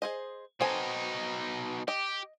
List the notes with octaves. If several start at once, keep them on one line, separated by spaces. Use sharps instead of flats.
G#4 C5 D#5
B2 C4 D#4 A4 G#5
G4 D#5